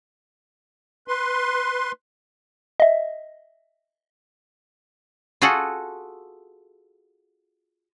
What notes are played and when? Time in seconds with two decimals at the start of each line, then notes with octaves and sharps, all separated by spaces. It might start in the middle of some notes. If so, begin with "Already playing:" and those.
1.08 B4 C6
2.80 D#5 E5
5.42 F4 F#4 G#4 A4 F#5